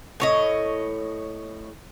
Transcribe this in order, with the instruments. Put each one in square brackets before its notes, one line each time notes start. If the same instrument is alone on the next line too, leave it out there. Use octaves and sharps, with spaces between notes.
[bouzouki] A2 C#5 D#5